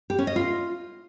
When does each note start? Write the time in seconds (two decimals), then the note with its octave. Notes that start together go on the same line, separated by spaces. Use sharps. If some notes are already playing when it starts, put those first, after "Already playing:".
0.10 G4
0.18 C#4
0.27 D#5
0.36 F4